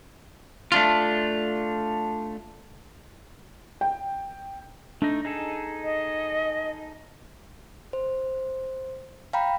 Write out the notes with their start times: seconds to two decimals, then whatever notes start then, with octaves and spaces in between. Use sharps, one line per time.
0.72 A3 D4 F4
3.81 G5
5.02 A3 D4 D#4
5.25 D#4 G#4 A4
5.84 D#5
7.93 C5
9.33 F5 G5 A#5 B5